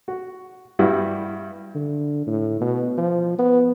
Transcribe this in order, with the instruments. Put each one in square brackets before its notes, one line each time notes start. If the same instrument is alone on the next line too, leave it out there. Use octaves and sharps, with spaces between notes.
[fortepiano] F#4
G2 G3 E4 F#4
[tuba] D3
A2
B2
F3
B3